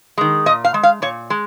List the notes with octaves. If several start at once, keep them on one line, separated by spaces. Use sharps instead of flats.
D#3 G#3
A#2 D#5
F5
G#3
F5
A#2 C#5
G#3